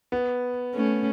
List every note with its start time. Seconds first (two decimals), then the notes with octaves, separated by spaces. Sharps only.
0.12 B3
0.75 A3 C#4